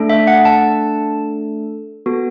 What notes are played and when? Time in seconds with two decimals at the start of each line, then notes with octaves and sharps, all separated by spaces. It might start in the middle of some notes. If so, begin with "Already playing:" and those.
Already playing: A3 D4 A4
0.09 E5
0.27 F#5
0.45 A5
2.06 B3 F#4 A4